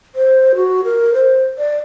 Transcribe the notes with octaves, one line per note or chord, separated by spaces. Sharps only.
C5
F#4
A#4
C5
D5